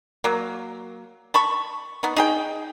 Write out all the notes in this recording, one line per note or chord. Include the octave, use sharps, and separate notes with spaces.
F#3 A#3
A5 B5 C#6
B3 D#4
D#4 G#4 G5